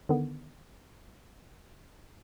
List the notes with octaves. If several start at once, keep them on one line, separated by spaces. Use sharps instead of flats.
D3 D#3 B3